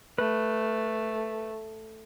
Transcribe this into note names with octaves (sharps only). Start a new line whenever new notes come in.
A3 B4